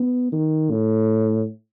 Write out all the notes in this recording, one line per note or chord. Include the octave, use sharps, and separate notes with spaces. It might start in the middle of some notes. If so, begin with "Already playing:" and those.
Already playing: B3
D#3
A2